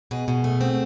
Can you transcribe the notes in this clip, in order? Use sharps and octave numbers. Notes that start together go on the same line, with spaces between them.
B2 G#4
B2
A3
C4